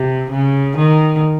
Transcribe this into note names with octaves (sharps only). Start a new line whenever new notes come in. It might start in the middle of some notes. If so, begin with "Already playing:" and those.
Already playing: C3
C#3
D#3